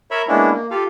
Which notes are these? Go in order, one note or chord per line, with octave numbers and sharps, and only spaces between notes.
A#4 C#5 E5 B5
G#3 A#3 B3 C#4 D4 E4
A#3
F4 G4 A4 F5